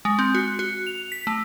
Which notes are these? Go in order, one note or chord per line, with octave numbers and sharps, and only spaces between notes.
G#3
C4
F#4
F#4
F7
B6
A3